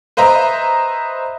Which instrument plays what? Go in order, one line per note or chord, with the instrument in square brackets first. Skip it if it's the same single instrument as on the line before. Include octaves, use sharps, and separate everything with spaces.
[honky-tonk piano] B4 C5 D#5 E5 A#5